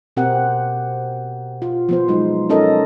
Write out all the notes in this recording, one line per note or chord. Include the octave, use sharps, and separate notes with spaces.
B2 C4 G4 A#4 F#5
F4
F3 B3 C5
F#3 G#3 D#4
C#4 D#4 A4 A#4 D#5